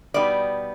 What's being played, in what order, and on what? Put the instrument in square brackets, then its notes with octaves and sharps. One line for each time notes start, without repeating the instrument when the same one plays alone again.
[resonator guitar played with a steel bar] B2 G3 B3 D#4 D5